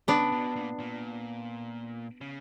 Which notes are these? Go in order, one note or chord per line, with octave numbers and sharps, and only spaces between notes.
C#3 B3 D4
B2
A#2
A#2
C#3